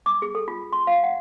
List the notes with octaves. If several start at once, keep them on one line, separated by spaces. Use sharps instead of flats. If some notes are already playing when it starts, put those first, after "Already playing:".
D6
G#4
A4
F4
C6
F5
F#5